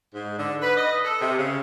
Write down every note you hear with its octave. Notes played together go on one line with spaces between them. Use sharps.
G#2
D3
B4
D#5
A4
C3
C#3